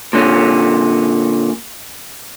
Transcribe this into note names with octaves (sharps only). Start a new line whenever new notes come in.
A#2 D3 C#4